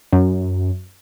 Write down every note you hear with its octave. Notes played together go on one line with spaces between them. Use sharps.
F#2